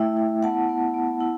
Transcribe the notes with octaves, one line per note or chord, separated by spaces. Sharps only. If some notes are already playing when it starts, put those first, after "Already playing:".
Already playing: A3 E4 E5 G5
E4
B3 F#5 A5
B3
B3
E4